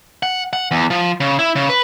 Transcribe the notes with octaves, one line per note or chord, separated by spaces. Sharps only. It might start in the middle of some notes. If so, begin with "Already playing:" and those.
F#5
F#5
E2
F3
C#3
E4
C#3
B4